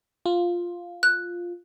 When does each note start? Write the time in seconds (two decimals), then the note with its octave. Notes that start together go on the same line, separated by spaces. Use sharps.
0.26 F4
1.03 F#6